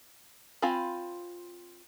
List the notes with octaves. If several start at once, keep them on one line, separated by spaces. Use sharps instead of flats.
C4 F4 F5 G#5 B5